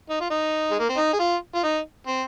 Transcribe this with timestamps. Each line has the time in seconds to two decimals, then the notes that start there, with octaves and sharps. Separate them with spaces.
0.10 D#4
0.21 F4
0.30 D#4
0.71 G#3
0.80 A#3
0.89 C4
0.97 D#4
1.13 G#4
1.20 F4
1.55 F4
1.63 D#4
2.07 C4